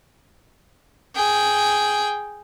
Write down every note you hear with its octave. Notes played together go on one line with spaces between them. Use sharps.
G#4 G5